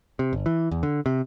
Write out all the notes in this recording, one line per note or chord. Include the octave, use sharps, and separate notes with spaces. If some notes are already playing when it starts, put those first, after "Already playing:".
C3
G1
E3
E2
D3
C3